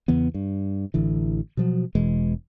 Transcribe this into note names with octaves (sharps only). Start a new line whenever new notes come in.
E2 C#3 E3 B3
G2
A1 D3 E3
B2 F3 F#3
E1 B2 E3 G#3